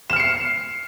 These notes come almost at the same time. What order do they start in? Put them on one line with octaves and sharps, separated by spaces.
E7 F6 C#7 C7